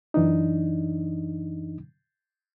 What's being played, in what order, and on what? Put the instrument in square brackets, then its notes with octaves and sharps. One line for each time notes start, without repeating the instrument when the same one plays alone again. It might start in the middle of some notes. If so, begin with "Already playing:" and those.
[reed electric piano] F#2 E3 D4 D#4